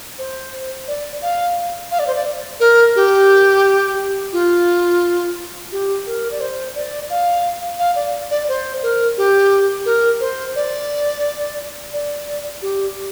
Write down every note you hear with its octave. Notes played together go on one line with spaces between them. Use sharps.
C5
D5
F5
F5
D5
C5
D5
A#4
G4
F4
G4
A#4
D5
C5
D5
F5
F5
D5
D5
C5
A#4
G4
A#4
C5
D5
D5
G4